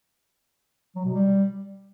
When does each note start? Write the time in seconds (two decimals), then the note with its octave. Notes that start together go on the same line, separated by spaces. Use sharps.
0.96 F#3
1.05 B2
1.14 G3